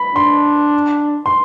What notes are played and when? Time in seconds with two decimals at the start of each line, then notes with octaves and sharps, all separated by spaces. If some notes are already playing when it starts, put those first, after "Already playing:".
Already playing: B5
0.15 D4 C6
1.26 C6